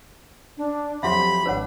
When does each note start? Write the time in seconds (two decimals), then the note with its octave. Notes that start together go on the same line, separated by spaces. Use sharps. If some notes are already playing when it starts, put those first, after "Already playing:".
0.57 D4
1.03 F2 F3 F#3 G4 E5 F#5 B5 C6
1.46 G#1 D4 B4 C#5 F#5